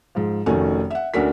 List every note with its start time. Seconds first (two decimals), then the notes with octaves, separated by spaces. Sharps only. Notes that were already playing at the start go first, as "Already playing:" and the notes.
0.15 G#2 F3
0.46 F1 D#3 A3 C#4 F#4 G#5
0.90 E5 F#5
1.14 D2 C#4 D4 F#4 A#4 B6